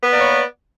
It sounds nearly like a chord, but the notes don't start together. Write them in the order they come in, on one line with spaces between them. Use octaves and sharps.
B3 B4 D5 A#3 C#5